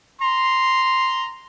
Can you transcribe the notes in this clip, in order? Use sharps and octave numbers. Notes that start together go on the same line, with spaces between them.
A#5 C6